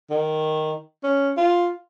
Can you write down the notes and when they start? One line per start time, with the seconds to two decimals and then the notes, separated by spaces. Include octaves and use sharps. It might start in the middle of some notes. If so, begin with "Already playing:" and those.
0.10 D#3
1.03 C#4
1.37 F4